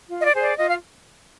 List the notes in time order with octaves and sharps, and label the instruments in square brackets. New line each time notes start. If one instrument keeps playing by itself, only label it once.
[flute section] F4
D#5
D5
G#4 C5
D5
F4 D#5
F5